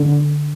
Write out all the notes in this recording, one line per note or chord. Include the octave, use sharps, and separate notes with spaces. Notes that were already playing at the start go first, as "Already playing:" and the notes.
Already playing: D3